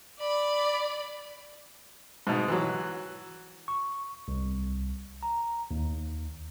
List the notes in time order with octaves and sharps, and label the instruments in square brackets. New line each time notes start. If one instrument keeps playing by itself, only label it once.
[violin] D5 B5
[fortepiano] G#2 B2
E3 F#3
[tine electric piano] C#6
C2
A#5
D#2